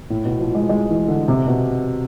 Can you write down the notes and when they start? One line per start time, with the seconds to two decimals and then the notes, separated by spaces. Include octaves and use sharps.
0.10 A2
0.25 B2
0.39 F3
0.55 G#3
0.69 G#3
0.89 E3
1.08 D3
1.28 C3
1.47 B2